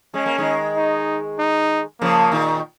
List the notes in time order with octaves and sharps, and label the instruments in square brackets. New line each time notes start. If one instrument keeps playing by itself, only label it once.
[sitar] G#3 [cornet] C#4
[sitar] A#3
D#3 G#3
[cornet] D#4
D#4
[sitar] C#3 F3 [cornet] A#3
[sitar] A#2 D#3